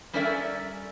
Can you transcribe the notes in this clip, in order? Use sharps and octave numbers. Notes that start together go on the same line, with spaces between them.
G3 C#4 A4 A#4 D5 E5